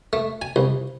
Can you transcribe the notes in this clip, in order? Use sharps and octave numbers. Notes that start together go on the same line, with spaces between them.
A3
G#5
C2